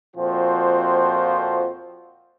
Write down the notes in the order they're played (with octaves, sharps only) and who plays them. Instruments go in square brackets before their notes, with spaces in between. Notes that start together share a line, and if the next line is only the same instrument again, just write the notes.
[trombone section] F2 A#2 F3 C4 F#4 C5